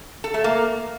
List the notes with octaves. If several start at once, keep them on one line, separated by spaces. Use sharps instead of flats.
A4
A3
A#3